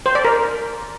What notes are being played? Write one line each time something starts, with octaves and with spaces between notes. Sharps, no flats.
C5
D5
A#4